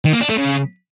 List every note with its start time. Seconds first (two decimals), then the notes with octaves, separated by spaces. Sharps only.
0.05 D#3
0.13 A#3
0.21 D4
0.29 A3
0.38 C#3